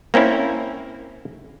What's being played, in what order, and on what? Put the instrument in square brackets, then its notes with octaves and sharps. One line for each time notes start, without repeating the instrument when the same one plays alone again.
[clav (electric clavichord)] A#3 C4 C#4 E4